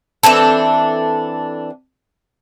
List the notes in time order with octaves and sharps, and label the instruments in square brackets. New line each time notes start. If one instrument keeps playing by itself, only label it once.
[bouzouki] E3 C4 D4 A4